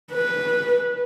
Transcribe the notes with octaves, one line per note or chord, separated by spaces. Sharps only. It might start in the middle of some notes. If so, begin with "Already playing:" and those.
B4